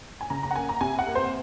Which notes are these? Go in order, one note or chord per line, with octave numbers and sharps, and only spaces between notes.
G#5
C#3 A#5
A#5
F#5
A#3 G#5
A#5
C3 G#5
F#5
A#3
C5